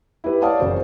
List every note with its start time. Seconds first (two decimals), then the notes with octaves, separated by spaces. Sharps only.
0.24 E4 G4 B4
0.42 C#5 D5 F5 A5 D#6
0.59 F#1 F#4 C5